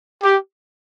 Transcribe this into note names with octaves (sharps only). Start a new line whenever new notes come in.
G4